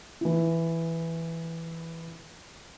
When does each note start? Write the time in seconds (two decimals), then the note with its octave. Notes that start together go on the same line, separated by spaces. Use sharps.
0.21 E3 E4